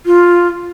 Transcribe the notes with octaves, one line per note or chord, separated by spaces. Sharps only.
F4